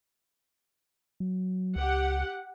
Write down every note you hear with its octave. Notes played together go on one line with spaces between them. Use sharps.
F#3
C#2 G4 F#5